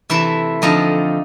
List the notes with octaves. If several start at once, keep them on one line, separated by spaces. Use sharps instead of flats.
C3 E3 A3 E4 E5
F2 D3 F3 D#4 D#5